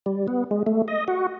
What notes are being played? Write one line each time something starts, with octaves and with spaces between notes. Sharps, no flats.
G3
B3
G#3
A3
D#5
F#4